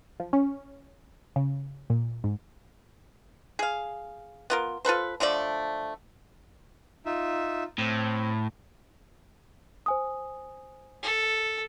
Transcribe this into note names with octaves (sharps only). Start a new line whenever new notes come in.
F3
C#4
C#3
A#2
G#2
G#4 F5
B3 F4 A#4
F4 A4 B4 C5
D3 F3 A3 D5
D#4 F4 E5
A2 C4
C5 G#5 D#6
A4